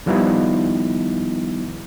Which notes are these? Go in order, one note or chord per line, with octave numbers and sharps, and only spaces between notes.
D#3 F3 G3 B3 D#4 E4